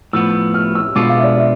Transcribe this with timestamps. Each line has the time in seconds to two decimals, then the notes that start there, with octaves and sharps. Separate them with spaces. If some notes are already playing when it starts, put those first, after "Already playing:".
0.13 A2 F3 B3 E6
0.54 F6
0.75 E6
0.96 B2 G#3 B3 D4 F4 D6
1.09 F5
1.18 E5
1.23 D5
1.37 E5